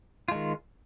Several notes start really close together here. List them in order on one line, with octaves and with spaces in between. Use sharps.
F4 G#3 D#3